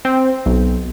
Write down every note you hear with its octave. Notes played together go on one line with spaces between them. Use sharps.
C4
B1